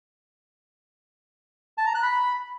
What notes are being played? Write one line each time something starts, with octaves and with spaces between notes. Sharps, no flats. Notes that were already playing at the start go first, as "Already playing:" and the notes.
A5
A#5
F#6
B5